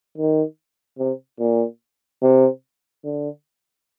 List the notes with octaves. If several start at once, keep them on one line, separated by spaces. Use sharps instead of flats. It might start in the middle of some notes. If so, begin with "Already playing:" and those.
D#3
C3
A#2
C3
D3